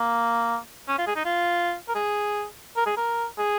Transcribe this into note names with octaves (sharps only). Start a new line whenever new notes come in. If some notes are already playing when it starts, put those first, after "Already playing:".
Already playing: A#3
C#4
F4
G#4
D#4
F4
A#4
G#4
A#4
G#4
A#4
G#4